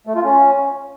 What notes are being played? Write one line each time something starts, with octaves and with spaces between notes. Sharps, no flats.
A3
F4
C#4